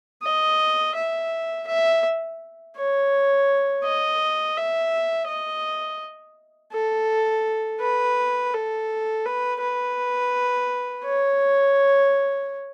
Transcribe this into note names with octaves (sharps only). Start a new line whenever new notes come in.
D#5
E5
E5
C#5
D#5
E5
D#5
A4
B4
A4
B4
B4
C#5